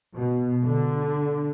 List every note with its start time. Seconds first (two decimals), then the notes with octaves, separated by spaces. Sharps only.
0.13 B2
0.64 D3